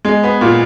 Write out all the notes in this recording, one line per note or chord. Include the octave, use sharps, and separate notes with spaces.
G#3
B3
A#2